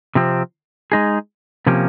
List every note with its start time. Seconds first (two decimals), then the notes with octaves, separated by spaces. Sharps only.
0.15 C3 F3 C4
0.92 G#3 D#4 G#4
1.66 C3 F3 A#3 C#4 G4